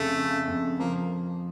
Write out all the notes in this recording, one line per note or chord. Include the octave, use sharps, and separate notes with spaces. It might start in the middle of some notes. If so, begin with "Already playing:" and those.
Already playing: F2 C#3 A3
C#3
F2
F3 A#3